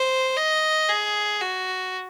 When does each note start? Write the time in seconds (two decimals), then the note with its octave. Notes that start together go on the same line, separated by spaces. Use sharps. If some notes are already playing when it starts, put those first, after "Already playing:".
Already playing: C5
0.36 D#5
0.88 G#4
1.41 F#4